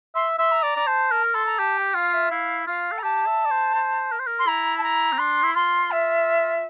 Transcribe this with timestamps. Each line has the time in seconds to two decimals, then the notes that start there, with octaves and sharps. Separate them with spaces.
0.15 E5 C6
0.38 E5 C6
0.51 A#5
0.63 D5
0.76 D5
0.87 C5 A5
1.11 A#4
1.23 A#5
1.34 A4 C6
1.46 A#5
1.59 G4 A5
1.77 G5
1.94 F4 F5
2.13 E5
2.31 E4 F5
2.67 F4 F5
2.92 A4
2.98 A#5
3.03 G4 A5
3.26 E5
3.45 D5
3.51 C5
3.75 C5
4.12 A#4
4.19 C5
4.27 A#4
4.39 C6
4.47 E4 A#5
4.77 A5
4.83 A#5
5.13 C4
5.19 D4 C6
5.43 E4
5.55 F4 C6
5.91 E5